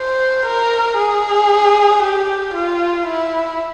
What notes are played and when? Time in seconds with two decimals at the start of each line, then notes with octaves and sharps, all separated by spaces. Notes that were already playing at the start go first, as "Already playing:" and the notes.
Already playing: C5
0.45 A#4
0.98 G#4
2.02 G4
2.54 F4
3.07 E4